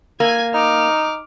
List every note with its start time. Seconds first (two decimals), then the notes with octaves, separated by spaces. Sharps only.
0.20 A#3 G#5 G#6
0.54 D#4 D6 F6